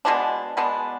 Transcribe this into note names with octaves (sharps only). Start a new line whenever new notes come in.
B2 G#3 B3 D4
B2 G#3 B3 D4